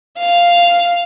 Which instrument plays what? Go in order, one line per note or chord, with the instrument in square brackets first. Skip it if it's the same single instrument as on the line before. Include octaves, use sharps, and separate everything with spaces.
[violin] F5